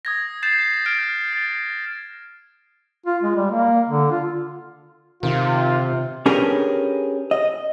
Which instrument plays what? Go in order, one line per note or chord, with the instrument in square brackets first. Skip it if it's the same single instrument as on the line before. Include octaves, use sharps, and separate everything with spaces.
[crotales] D#6 G#6 A#6
G6 A6 C7 E7
F6 G6 D7
A6
[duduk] F4
G#3
G3
A#3
D3
F4
[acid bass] C3 [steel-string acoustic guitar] D#3 [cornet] F4
[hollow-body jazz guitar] C#4 D4 G4 G#4 A#4 B4
D#5